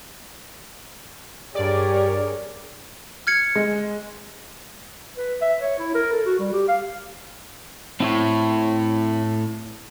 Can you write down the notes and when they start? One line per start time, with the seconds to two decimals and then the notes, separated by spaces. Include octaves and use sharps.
1.55 G2 G4 G#4 A#4 C#5 D5
3.27 F6 G#6 C#7
3.56 G#3
5.17 B4
5.42 E5
5.61 C#5
5.79 E4
5.95 A#4
6.12 A4
6.26 F#4
6.39 G3
6.53 G4
6.68 F5
8.00 A2 C4 E4 C#5